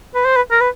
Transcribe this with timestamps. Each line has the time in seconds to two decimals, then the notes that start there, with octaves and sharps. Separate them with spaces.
0.15 B4
0.25 C5
0.36 B4
0.51 A#4
0.60 B4